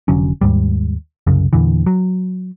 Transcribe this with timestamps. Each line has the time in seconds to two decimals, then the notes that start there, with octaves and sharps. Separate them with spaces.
0.08 F1 D3 F#3 C#4
0.41 D#2 G#2 G3
1.27 C2 F#2 C#3
1.53 E2 A#2 D3 E3
1.86 F#3